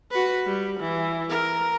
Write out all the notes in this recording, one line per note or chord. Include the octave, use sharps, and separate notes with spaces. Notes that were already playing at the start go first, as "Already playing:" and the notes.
F#4 B4
G3
E3
A#4